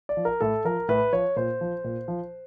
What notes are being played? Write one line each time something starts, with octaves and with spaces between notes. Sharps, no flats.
D5
F3
A#4
A2 A4
F3 A#4
A2 B4
F3 C#5
A#2 C5
F3
A#2
F3